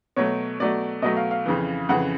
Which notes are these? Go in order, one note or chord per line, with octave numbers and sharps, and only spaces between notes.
B2 F#3 A3 C#5
B2 F#3 A3 D5
B2 F#3 A3 D#5
F5
F5
F2 C#3 E3
F2 C#3 E3 F#5